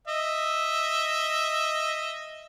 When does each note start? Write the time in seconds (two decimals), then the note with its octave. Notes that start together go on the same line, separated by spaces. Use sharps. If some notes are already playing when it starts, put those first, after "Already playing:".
0.08 D#5 E5